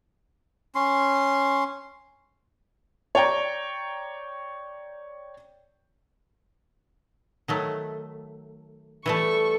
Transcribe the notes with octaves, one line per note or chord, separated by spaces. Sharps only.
C#4 C6
C#5 D5 G5 A#5
D#3 F#3 A3
E3 G3 A3 A4 C#6